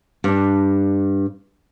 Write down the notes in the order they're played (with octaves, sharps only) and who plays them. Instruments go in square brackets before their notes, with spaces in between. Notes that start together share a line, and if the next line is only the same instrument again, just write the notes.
[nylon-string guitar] G2 D4